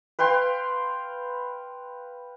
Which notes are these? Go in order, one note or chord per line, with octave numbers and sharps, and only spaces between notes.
B4 F5 G5 C6